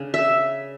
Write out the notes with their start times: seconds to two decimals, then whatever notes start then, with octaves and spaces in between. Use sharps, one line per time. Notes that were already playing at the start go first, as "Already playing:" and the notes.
Already playing: C#3 D4
0.14 E5